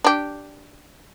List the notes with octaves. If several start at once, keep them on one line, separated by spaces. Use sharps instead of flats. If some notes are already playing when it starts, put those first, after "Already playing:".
D4 G4